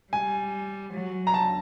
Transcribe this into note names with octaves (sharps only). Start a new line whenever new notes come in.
G3 G#5
F#3
A#5
A5